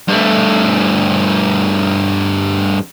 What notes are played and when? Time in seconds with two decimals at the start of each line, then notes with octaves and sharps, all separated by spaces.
0.08 G2 A3